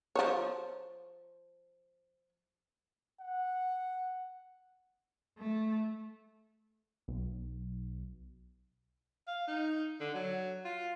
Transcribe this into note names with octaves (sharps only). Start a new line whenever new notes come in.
F3 C5 C#5
F#5
A3
B1
F5
D#4
D3
F#3
F4